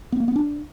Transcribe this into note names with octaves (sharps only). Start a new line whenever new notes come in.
B3
A#3
B3
D4